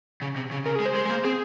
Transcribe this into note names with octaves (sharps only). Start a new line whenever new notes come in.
C#3
C3
C#3
C#3 A#4
G#4
G#3
C5
G#3
G#3
A#3
C4 G#4